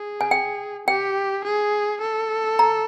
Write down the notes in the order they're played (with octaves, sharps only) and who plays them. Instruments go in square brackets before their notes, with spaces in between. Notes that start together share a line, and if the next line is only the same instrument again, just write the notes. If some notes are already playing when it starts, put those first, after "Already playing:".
Already playing: [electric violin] G#4
[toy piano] G#5
G5
[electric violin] G4 [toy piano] G5
[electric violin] G#4
A4
[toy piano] A#5